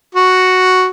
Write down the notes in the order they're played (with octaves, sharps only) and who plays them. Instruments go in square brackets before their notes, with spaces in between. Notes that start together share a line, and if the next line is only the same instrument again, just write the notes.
[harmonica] F#4